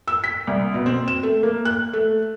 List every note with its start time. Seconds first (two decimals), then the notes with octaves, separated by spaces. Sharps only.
0.08 E6
0.24 B6
0.47 C2
0.74 B2
0.86 C4
1.08 E7
1.23 A3
1.43 A#3
1.65 F#6
1.93 A3